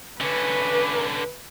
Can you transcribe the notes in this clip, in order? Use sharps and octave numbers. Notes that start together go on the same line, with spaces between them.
D3 C#4 B4